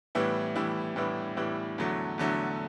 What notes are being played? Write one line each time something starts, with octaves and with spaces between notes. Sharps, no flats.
A2 E3 G3 B3 E4
A2 E3 G3 B3 E4
A2 E3 G3 B3 E4
A2 E3 G3 B3 E4
E2 D3 F#3 A3
E2 D3 F#3 A3